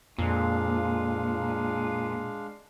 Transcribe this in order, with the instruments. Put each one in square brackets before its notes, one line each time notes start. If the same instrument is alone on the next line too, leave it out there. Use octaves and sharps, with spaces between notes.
[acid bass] F2 [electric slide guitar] A#2 [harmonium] G#3 D4 F5